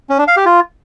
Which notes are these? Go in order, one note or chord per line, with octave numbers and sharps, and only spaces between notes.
C#4
D4
F5
G4
F4